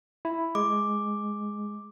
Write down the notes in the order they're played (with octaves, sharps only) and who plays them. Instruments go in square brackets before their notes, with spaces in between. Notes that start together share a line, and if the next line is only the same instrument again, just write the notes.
[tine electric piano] E4
[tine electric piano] G#3 [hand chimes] D6